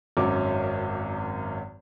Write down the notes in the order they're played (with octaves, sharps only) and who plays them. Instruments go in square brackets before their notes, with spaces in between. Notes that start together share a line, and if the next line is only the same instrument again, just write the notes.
[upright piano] G#1 F#2 F#3 C#4 D6